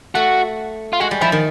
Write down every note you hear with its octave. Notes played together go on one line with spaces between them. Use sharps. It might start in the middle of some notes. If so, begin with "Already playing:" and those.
A3 F#4
F4
G#3 F#4
G3
F3 E4
D#3